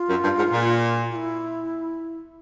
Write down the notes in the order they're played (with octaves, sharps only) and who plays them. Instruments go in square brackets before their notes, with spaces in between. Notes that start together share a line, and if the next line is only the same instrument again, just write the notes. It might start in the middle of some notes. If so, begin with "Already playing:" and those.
Already playing: [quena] F4
[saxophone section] F#2
G2
G#2
A#2
[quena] F4
E4